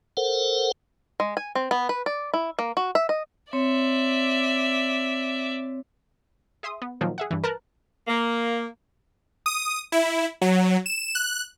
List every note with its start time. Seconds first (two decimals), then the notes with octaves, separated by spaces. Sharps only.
0.17 A4 A#4 C5 F#5
1.20 G#3
1.37 G#5
1.55 C4
1.71 B3
1.89 B4
2.06 D5
2.34 E4
2.59 A#3
2.77 F#4
2.95 E5
3.09 D#5
3.53 C4 C#5 D5 E5
6.63 G#4 E5 C6 D#6
6.82 B3
7.01 A#2 D#3 F3 F#3
7.18 G#4 E5 F#5
7.31 G2 E3
7.44 A#4 B4 A5 F#6
8.08 A#3
9.46 D#6
9.92 E4
10.42 F#3
10.86 E7
11.15 F#6